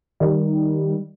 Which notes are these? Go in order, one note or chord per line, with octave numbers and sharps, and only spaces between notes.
D#3 G3